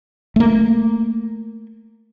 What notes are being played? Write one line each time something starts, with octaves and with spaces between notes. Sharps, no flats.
A3 A#3